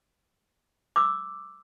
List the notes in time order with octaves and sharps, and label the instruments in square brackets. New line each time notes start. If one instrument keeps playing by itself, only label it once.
[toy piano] D6 E6